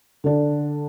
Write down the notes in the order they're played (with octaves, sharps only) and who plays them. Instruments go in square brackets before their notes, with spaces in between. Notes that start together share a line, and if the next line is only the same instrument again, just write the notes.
[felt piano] D3 D4